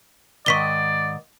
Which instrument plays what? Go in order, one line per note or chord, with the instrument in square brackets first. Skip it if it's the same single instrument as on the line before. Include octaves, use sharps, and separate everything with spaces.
[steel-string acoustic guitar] G#2 D#3 D#5 [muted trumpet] D5 [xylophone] C#6 B6 G7